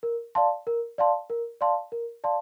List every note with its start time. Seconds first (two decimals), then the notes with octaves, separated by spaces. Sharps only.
0.03 A#4
0.35 D5 F5 A5 C6
0.67 A#4
0.98 D5 F5 A5 C6
1.30 A#4
1.61 D5 F5 A5 C6
1.92 A#4
2.24 D5 F5 A5 C6